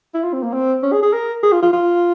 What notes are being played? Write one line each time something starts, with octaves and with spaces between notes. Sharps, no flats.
E4
F4
C4
A#3
C4
C#4
G#4
G#4
A#4
G#4
F4
F4
F4